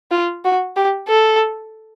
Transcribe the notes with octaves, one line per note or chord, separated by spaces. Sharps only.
F4
F#4
G4
A4